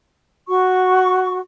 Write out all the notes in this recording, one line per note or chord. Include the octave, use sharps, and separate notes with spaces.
F#4 C#6